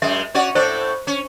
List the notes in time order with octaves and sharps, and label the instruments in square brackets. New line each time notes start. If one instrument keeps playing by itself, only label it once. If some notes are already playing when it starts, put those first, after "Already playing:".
[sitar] F#2 G#3 [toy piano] E5
[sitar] C#4 F#4 D5
[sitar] A2 A4 D5 [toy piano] C5
[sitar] C#4